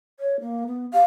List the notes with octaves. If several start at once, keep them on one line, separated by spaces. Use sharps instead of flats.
C#5
A#3
B3
G4 F5